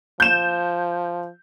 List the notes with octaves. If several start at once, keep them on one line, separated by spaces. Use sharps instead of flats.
F3 G6 E7